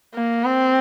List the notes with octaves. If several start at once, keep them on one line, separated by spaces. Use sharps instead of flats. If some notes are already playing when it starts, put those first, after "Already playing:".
A#3
C4